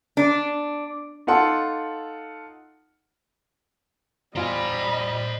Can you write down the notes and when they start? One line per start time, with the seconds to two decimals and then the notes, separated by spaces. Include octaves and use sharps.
0.17 D4
1.27 D#4 F4 A4 F#5 A5 C6
4.36 E2 G3 F4 C5 D#5 G#5 A#5 B5